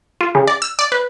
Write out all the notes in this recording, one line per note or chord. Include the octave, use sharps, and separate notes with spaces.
F4
C#3
D5
E6
D5
B4